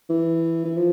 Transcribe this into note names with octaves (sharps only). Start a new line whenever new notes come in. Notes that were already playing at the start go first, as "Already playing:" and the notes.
E3
E3
F3